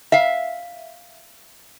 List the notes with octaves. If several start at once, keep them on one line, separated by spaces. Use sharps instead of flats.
E5 F5